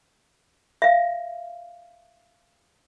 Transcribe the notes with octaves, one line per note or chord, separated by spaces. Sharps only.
E5 F5